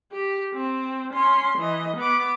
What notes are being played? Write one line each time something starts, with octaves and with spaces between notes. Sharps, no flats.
G4
C4
C#4 C6
E3 D#5
B3 D6